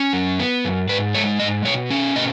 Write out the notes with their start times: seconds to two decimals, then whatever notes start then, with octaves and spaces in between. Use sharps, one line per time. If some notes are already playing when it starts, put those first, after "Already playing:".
Already playing: C#4
0.13 F#2
0.40 B3
0.65 F#2
0.89 G#2 B4
1.15 G#3 C#5
1.40 G#2 D#5
1.65 B2 C#5
1.90 C#4
2.16 B2 D#5